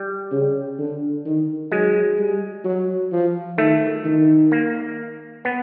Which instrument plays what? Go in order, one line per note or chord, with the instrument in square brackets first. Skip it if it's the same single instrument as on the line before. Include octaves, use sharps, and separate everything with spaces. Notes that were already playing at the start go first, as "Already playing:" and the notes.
Already playing: [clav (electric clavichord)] G3
[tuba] C#3
D3
D#3
[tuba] F#3 [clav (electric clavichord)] G#3
[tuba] G3
F#3
F3
[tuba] D#3 [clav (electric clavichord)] A3
[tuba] D#3
[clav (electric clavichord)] A#3
B3